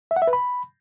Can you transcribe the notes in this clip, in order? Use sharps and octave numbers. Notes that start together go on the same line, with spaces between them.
E5
F#5
E5
B4
B5